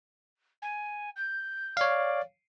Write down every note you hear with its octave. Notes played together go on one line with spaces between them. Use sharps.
G#5
G6
C#5 D5 F5